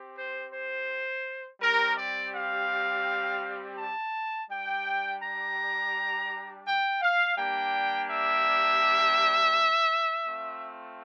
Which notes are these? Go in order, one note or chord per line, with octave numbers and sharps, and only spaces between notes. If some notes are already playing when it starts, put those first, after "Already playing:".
Already playing: C4 G4
C5
C5
G3 C4 G4 A#4
D5
F5
A5
G3 D4 G4 G5
A#5
G5
F5
G3 A#3 D4 G4 G5
E5
A3 C4 F4